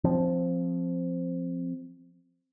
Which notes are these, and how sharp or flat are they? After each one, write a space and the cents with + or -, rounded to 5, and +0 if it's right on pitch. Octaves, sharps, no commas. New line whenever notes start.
F3 +0 C4 +0